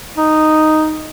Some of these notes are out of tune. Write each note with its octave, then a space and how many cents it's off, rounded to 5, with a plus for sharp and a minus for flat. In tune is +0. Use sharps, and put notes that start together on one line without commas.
D#4 -5